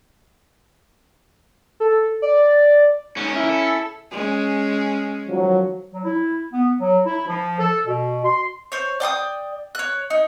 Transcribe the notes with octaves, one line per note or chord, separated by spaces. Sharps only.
A4
D5
G#2 D#3 C#4
C#2 E4 A#4
A4
G#3 C#4
D#3 F3 F#3
F#3
E4
B3
F#3
E4
F3
A4
B2
C6
C5 C#5
D5 G5 C6 D#6
C#5 F#6
D#4